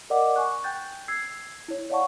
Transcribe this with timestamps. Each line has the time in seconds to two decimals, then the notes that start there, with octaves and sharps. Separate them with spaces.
0.10 A#4 D5 D#5 F#5 D6
0.36 G#5 C#6 F#6
0.64 G5 F#6 G6 A6
1.08 E6 G#6 C7
1.68 E4 C#5
1.90 C#5 D5 F5 F#5 A5 C#6